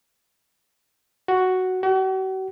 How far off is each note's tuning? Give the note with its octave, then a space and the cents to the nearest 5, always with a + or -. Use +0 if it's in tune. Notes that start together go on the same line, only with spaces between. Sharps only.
F#4 +5
F#4 +45